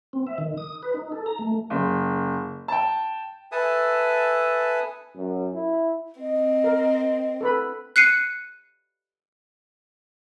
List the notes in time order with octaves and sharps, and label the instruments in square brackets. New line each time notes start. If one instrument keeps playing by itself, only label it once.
[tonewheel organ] C4
E5
D#3
D#6
B4
D#4
A4
A#5
A3
[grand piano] F#1
G5 A5
[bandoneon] A4 B4 E5 G#5 A5 D#6
[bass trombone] F#2
E4
[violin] C4 [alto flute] D#5
[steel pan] A#4
A4 B4 B5
[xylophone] F#6 C7 C#7 D#7